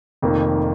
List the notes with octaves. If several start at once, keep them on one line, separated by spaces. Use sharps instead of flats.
F1 F2 D#3 A#3